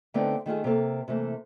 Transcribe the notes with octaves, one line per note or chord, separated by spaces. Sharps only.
D3 A3 B3 C4 D#4
D#3 A3 F4 G#4
C3 A#3 A4
C3 E3 A3 A#3